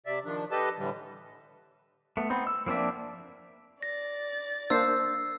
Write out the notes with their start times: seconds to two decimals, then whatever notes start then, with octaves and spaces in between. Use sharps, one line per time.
0.06 C3 D5 E5
0.25 D#3 F3 D4
0.51 G4 A4 B4 D#5 A5
0.78 A2 D3 E3 G3
2.17 A3 B3
2.30 B3 C4 D#4
2.47 E6
2.66 F3 A#3 C4 D4 E5
3.83 D5 A6 A#6
4.70 A#3 D4 C5 E6 C7